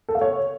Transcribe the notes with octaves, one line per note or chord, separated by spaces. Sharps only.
A4
F5
C#5